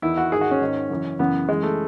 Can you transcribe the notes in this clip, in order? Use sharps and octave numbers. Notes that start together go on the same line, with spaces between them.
E2 D#3 E4
F#4
G#2 D#3 G#4
F#4
C#4
G#2 D#3
F#2 C#3 E3
F#2 C#3 E3 B3
F#2 C#3 E3 G#3
A3